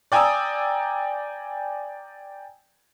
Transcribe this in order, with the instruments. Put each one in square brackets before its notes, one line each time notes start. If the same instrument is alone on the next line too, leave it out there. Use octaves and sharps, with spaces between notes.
[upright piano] D5 G5 G#5 A#5 D#6 E6